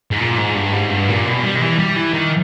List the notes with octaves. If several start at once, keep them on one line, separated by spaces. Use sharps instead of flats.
G#2
A#2
G#2
G2
G#2
G2
A#2
B2
G3
D#3
E3
G3
E3
D#3